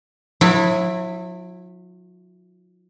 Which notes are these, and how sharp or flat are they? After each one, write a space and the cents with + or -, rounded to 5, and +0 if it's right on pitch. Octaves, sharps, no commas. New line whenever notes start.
F#3 -40 E4 +0